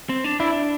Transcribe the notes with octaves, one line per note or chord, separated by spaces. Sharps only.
C4
D4
D4 E4